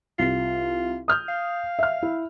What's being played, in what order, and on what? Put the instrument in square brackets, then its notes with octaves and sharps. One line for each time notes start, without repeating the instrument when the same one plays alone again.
[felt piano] C2 [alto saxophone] F4
[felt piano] D#6 F6 G6
[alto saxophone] F5
[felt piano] E5 F6
E4